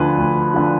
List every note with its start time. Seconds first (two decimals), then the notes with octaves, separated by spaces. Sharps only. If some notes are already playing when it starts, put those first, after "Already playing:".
Already playing: D2 D3 F3 B4
0.18 D2
0.54 D3 F3